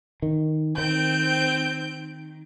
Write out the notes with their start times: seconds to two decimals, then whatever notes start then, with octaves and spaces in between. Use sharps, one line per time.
0.22 D#3
0.78 D#3 C4 G6 D7